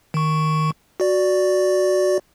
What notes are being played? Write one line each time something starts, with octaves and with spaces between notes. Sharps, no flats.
D#3 C#6
F#4 D5